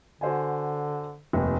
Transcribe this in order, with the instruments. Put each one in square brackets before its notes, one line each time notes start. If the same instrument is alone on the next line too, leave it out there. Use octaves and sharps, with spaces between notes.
[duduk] D3 [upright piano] F#4 C5 G#5
[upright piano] F1 D#2